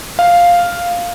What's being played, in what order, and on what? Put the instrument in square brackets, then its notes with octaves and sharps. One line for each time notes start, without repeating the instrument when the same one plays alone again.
[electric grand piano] F5